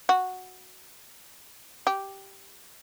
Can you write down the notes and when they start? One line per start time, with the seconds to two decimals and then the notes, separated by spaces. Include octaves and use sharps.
0.09 F#4
1.87 G4